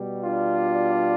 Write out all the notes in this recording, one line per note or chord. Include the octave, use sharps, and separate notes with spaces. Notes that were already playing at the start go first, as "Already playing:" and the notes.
Already playing: B2 G3
D4 F4